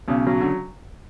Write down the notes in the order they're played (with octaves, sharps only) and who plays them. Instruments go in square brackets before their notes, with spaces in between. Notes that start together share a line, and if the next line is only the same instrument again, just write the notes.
[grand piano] B1 [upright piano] C#3
[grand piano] F#3
[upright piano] D3